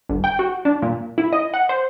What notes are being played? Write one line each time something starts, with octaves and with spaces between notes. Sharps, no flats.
G1
G5
F#4
D4
A#2
E4
D#5
F#5
C5